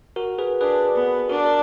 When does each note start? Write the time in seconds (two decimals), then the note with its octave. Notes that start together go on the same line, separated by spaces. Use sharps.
0.16 F#4 A#4
0.38 G#4 B4
0.61 D4 G#4 B4
0.96 B3
1.29 D4 F#4 A#4
1.46 A#4